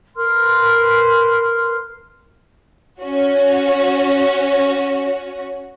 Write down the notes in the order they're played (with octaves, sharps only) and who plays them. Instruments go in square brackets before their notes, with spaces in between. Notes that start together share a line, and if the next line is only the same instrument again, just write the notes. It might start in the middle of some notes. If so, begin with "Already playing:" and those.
[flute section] A#4 B4 C6 F6
[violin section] C#4 F#4